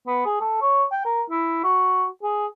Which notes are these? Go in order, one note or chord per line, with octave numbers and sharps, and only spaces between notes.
B3
G#4
A4
C#5
G5
A#4
E4
F#4
G#4